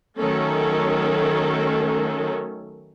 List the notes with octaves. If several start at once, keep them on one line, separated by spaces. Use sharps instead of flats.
D#3 F#3 A3 C#4 A4